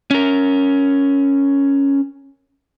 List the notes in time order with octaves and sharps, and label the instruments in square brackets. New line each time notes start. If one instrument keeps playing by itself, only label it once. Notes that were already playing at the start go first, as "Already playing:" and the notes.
[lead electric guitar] C#4 A#4